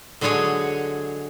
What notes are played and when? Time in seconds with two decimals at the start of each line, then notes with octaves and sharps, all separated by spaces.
0.21 D3 F#3 G#3 G#4 C#5